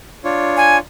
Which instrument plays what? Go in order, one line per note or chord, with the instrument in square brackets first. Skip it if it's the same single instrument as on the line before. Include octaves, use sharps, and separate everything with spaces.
[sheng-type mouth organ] D4 F4 C#5
[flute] G#5